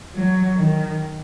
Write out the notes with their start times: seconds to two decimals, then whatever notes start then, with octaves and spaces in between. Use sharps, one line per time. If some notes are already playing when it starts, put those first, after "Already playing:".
0.15 F#3
0.56 D#3